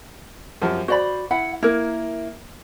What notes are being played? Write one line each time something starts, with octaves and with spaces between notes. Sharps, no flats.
F#2 F3 G3
F#4 C5 D5 B5
E4 F#5 B5
A#3 E4 A#4